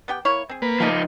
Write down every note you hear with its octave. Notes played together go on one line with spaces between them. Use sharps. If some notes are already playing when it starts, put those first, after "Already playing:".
B3 G4 G5
A#3 E4 C#5
C4 G#4
A#3 B4
F3 D#4 G4 A4 D5